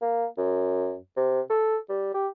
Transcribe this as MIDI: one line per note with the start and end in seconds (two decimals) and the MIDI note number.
0.01 0.25 58
0.37 0.96 42
1.16 1.41 48
1.50 1.77 69
1.89 2.12 55
2.14 2.27 67